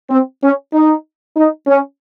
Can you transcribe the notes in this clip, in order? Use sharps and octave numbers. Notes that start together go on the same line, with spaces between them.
C4
C#4
D#4
D#4
C#4